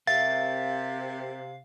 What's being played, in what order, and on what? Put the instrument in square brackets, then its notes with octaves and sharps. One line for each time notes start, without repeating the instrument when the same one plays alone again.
[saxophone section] C3 [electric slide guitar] A#4 E5 [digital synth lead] F5 [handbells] A6